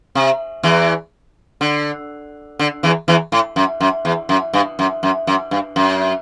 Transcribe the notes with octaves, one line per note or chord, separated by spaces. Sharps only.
C3
E2 E3
D3
D3
E2 E3
E2 E3
A2
F#2
F#2
E2
F#2
G2
F#2
F#2
F#2
G2
F#2